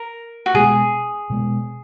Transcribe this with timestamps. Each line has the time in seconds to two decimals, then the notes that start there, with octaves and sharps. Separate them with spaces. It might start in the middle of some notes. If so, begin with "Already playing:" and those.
Already playing: A#4
0.46 F#4
0.54 B2 G#3 B3 G#4
1.30 B2 G#3 B3